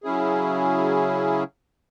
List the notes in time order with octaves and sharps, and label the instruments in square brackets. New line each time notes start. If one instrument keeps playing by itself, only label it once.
[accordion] C#3 F#3 C#4 E4 G#4